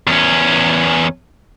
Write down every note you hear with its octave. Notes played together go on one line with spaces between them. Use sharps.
E2 C#4